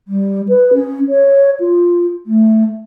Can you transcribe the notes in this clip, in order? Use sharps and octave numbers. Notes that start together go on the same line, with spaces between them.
G3
B4
C#4
C#5
F4
A3